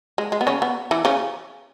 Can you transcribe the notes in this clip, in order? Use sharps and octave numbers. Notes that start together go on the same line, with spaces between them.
G#3
G#3
B3
C#3 C#4
B3
E3 E4
C#3 C#4